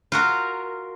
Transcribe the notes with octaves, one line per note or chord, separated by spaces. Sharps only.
F4 F#4 A#4